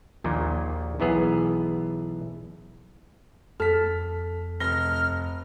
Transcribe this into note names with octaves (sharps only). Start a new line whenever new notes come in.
A#1 D#2 A#2
B1 E3 B3 G#4
F2 A4 F6 B6
F1 F6 A#6 G7